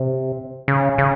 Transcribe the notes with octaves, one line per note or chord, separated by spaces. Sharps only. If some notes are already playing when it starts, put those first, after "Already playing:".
Already playing: C3
C#3
C#3